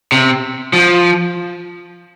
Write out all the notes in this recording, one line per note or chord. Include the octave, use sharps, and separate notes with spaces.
C3
F3